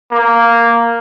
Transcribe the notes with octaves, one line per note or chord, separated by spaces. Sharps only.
A#3